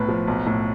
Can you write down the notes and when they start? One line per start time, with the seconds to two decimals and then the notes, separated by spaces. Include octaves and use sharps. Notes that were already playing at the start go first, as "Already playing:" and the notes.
Already playing: B1 A2 B4
0.08 F3
0.27 B1
0.46 A2